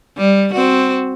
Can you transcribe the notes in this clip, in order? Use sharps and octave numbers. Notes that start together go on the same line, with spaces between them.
G3
C4 F#4